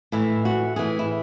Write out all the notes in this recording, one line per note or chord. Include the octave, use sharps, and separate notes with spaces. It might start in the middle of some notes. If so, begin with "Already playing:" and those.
A2 E3 E4
F#4
A2 E3 G#4
E4